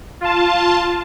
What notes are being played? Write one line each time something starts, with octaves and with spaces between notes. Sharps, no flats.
F4 A5